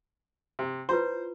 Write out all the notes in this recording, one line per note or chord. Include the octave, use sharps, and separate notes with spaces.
C3
E4 F4 B4 C5